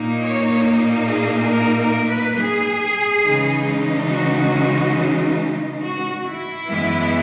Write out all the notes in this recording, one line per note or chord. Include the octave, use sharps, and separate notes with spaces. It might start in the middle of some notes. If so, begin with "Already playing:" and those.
Already playing: A#2 A#3 D#4
C#5
G#4
A#4
A#4
B4
G#4
C#3 E3 G#3 D#4
F#4
F#4
E4
F#2 E3 G#3 B3